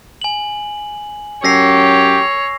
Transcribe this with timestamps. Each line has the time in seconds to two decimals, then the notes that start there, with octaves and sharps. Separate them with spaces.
0.22 G#5 F#7
1.44 F#2 G4 C#5 E6 A#6 C7